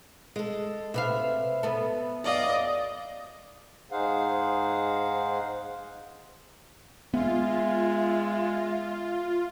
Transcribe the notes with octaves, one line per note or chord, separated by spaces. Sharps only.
G#3 A4
C3 B4 E5 F5
B3 A4
F#2 D5 D#5 F5
G#2 D#4 G#4 C5 F5 F#5
G#3 B3 F4 E5